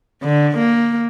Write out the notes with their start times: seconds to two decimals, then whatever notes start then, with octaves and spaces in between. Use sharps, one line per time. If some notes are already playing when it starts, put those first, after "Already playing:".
0.22 D3
0.58 A#3